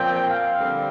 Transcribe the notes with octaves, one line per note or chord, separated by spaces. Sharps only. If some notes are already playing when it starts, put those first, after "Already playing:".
Already playing: A#2 F3 C4 G5
F5
D3 G3 C4